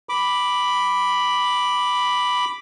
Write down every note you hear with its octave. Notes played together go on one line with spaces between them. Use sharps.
B5 D6